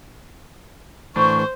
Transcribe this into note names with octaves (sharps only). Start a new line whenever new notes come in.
A2 E3 D4 C5 C#6